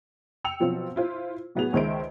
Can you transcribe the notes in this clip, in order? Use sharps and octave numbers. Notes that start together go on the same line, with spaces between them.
G5 E6 C#7 F7
B2 F3 F#3 C4 F4
E4 F4 C5
A2 F#3 B3 F#4 G#4 F7
C#2 D#3 G#3 C5 E5 D7